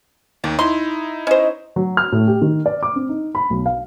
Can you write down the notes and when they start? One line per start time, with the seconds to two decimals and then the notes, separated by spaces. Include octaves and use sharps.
0.44 D#2 D#3 D5
0.59 D#4 E4 C6
1.27 C#4 C5 D#5
1.76 F#3
1.97 F6
2.12 A2
2.28 G4
2.42 D#3
2.66 D5
2.83 D6
2.96 C4
3.09 D#4
3.35 B5
3.50 B1
3.66 F5